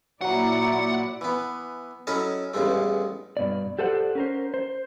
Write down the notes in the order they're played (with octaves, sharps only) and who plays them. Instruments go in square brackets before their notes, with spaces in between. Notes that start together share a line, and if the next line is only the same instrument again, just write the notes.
[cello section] A#2 E4 D5 [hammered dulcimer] F#3 A#5 [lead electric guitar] F#5
[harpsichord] E3 B3
F#3 C#4 E4 A4 D#5
A1 E2 G2 G#3 A3
[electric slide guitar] G2 B2 D5
G4 A4 C5 D5 F#5
C#4 A#4 C5
C5